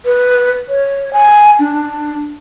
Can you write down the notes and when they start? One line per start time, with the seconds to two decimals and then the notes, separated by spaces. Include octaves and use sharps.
0.06 B4
0.69 C#5
1.13 G#5
1.60 D4